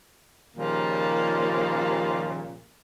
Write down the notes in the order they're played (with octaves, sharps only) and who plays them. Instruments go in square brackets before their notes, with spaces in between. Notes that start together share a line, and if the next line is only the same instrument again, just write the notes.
[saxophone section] D#2 A#2 C#3 F3 G3 A#3